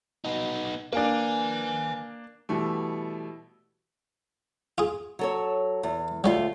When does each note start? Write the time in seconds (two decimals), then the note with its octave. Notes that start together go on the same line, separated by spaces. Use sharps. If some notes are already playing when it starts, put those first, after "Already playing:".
0.25 B3 D#4
0.93 A#3 D4 B4 G#5
2.49 B2 E3 G3 A3
4.78 F4 G#4
5.19 F#3 A4 C#5
5.83 E2
6.24 D2 F#3 G3 A3 F4